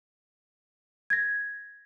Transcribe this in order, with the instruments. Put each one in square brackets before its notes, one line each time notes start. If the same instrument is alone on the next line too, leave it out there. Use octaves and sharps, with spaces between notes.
[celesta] G#6 A#6